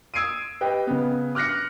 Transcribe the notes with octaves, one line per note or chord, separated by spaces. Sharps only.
D#6 E6 G#6 C7 D7 D#7
G4 B4 D#5 G5
C#3 B3
D6 F6 F#6 A#6 C#7